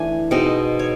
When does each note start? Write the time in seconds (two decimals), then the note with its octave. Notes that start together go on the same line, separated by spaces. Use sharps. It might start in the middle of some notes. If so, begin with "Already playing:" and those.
Already playing: E3 A3 D4 G#5
0.31 B2 G#3 C4 D#4 D#5
0.79 C#5